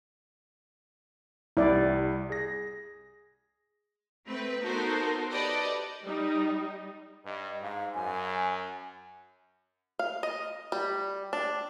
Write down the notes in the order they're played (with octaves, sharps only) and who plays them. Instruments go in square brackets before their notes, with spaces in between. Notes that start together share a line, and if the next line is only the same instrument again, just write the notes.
[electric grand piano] C2 G3 [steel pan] E4 D5
[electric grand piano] G#4 A#6
[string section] A3 C4 B4
B3 D#4 F#4 A4 A#4 C5
G4 A4 B4 D5 D#5
[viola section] G3 D#4
[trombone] G2 [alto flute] D#5
[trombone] G#2 [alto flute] F5
[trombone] F#2 [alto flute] G#5
[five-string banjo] F5
D#5
G3
D4